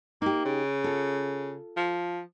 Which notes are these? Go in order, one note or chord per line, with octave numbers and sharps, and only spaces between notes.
A#3 D#4 G4
C#3
F4 A4
F3